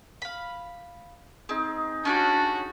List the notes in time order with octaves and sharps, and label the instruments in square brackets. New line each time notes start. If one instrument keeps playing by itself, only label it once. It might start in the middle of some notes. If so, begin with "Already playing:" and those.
[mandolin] F5 B5
[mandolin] C4 [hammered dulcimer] D#4 G#4
[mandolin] C#4 G4 G#5 [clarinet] D4 [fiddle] F#4